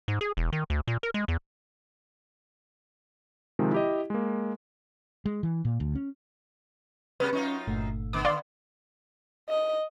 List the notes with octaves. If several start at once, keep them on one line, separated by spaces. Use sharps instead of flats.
G#2
G#4
E1
D#3
D2
A#2
A#4
G#3
E2
C3 D#3 F3 G#3
E4 G4 D#5
G#3 A#3
G#3
E3
A#2
D2
C#4
C3 G3 B3 B4
F#2 C#4 D#4 F4 C#6
G1 A#2 A3
D3 B3 D6
D5 F5 C6
D#5